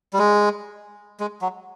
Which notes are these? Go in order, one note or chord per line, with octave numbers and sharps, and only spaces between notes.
G3
G#3
G#3
F#3